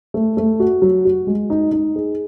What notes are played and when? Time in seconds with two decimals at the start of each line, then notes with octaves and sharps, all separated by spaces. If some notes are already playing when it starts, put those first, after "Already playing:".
0.14 A3
0.37 A3
0.60 F#4
0.82 F#3
1.05 F#4
1.27 G#3
1.50 D#4
1.72 D#4
1.96 G#4